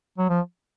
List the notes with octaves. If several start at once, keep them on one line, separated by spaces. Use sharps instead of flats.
F#3
F3